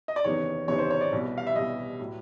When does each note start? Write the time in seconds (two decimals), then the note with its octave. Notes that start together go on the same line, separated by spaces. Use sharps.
0.08 D#5
0.16 D5
0.24 F#1 E2 C3 D#3 C#5
0.68 F#1 E2 C3 D#3 C#5
0.79 C5
0.90 C#5
1.01 D5
1.13 C2 B2 G3
1.38 F5
1.47 E5
1.55 C2 B2 G3 D#5
1.99 A2 F#3